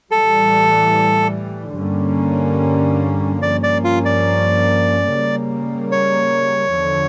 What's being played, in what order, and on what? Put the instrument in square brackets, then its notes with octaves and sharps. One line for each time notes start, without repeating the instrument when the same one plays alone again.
[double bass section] A2 E3 G3 [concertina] A4
[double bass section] G2 D3 G3 A#3 C#4
[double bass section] G2 F3 A#3 C#4 [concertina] D5
[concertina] D5
F4
D5
[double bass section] C#3 G3 A#3
[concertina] C#5
[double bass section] E2 D3 F3